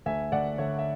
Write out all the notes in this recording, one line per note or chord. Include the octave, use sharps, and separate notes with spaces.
D2 E5 G#5
D2 D5 F#5
D3 C#5 E5
E5